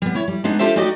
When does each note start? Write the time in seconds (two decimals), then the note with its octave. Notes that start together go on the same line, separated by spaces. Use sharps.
0.02 G3 B3
0.15 E4 C#5
0.28 G3
0.44 G#3 B3 D4 D#4 G#4
0.59 D4 F4 G4 A4 C5 E5
0.76 D#4 F#4 G4 D5 D#5